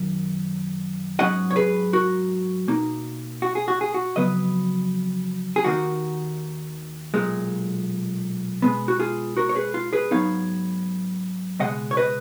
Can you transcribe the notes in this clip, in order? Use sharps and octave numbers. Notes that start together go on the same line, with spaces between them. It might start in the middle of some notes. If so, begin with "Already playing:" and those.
Already playing: F#2 D#3
G#2 F#3 C#4 D#5 F#5
C#5
G#4 B4
F#4 A#4
B2 A#3 D#4
F#4
G#4
F#4
G#4
F#4
F2 C#3 F#3 B3 B4 D#5
G#4
D#2 D#3 A#3 D#4 F#4
B1 A#2 G#3
B2 G#3 B3
F#4
F4 G#4
F#4 A#4
C#5
G#4 B4
F4
G#4 B4
G#2 F#3 B3 D#4 C#5 F5
C#2 B2 G#3 D#5 F#5
C#5
B4 D#5